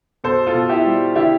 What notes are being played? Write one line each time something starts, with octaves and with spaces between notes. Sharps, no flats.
B2 A4 C5
F4 A4
B2
E4 G4
G3
D3 E4 G4